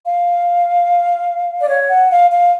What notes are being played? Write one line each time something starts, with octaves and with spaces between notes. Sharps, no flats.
F5
D5
C#5
F#5
F5
F5